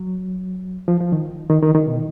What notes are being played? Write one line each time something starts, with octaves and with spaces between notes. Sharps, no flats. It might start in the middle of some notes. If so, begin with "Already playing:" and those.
Already playing: F#3
F3
F3
D#3
D#3
D#3
D#3
B2